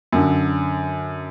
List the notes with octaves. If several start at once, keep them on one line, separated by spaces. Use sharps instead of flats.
F#2 D3